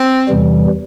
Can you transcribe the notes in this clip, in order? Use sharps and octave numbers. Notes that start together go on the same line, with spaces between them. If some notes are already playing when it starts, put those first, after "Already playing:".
Already playing: C4
E2 C3 E3 G3